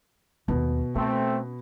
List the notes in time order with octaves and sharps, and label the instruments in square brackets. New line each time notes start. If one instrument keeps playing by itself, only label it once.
[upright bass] D#2 A3 [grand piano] B2
[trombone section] A3 C4 [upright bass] C#4